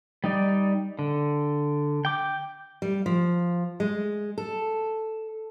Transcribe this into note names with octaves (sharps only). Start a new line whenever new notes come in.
G3 D#4 D5
D3
G5 D6
G3
F3
G#3
A4